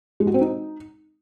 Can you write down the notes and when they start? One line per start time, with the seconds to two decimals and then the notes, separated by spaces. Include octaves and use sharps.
0.20 G#3
0.27 F#4
0.34 C4
0.41 D#4